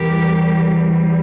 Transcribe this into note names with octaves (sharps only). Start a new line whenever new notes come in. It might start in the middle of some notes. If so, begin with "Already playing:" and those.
Already playing: E2 E3 G3 G4 A#4